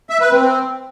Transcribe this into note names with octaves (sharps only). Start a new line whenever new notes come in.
E5
B4
C4